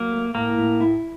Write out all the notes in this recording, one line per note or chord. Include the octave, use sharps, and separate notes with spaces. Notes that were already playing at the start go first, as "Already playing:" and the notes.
Already playing: F#3 A#3
A3
A2 A#3
A2
E4